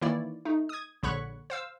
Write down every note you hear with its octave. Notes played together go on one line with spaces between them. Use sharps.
D#3 E3 A#3 E4 C#5 D5
A3 D#4
D#6 G#6
A#1 D3 C#5 B5 C#6 F#6
C5 F5 E6